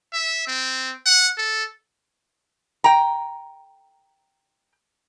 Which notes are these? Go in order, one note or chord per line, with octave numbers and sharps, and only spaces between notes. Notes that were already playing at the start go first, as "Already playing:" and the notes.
E5
C4
F#5
A4
G5 A#5